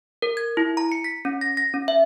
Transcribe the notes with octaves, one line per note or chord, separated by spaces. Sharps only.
A#4
G#6
E4
A#5
C#7
B6
C#4
A#6
A#6
C#4
E5